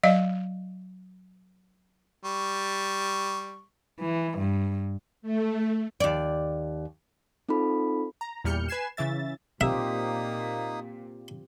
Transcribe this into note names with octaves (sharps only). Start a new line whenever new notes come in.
F#3 D5 D#5 F5
G3 C#6
E3
G2
A3
D#2 D5
C4 D#4 F4 A4 B5
A#5
E2 A#2 G3 F6 G6 C#7
B4 G#5 G#6 C7 E7
C#3 E3 E5 A6
A#2 A#3 C4 D#4 F4 G4 E5 D#6